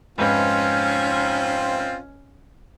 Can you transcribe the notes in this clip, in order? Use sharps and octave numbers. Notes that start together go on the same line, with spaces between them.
F1 G#2 C4 C#4 F4 B4